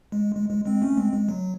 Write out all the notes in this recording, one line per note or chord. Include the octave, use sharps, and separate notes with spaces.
G#3
G#3
G#3
G#3 C4
A3 C#4
G#3 C4
G#3
F#3